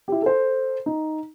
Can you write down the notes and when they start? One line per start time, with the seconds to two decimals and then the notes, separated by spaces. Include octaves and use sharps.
0.08 E4 G4
0.22 A4 C5
0.86 D#4